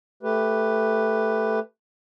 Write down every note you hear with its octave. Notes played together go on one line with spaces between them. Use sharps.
A3 G4 B4